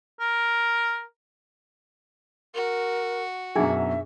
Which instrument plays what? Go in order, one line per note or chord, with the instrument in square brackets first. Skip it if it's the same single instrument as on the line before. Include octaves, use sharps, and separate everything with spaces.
[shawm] A#4
[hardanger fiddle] F#4 [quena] A#4
[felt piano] F#2 B2 F#3 [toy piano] D4 D#4 G#4 [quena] E5